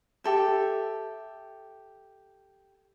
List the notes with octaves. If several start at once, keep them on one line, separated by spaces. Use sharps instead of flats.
G4 A4 E5